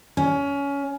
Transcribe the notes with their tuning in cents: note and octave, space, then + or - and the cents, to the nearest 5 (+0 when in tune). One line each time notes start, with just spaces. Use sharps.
C#4 +20